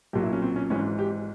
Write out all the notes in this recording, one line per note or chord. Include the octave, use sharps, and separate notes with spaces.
B1 A#2 F#3 G4
E4
C#4
C4
C#4
G#1 G#2 E3 G#3 C#4
G4